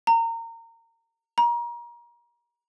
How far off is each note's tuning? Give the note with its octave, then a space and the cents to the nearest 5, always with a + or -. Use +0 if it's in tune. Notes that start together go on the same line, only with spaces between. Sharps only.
A#5 -25
A#5 +30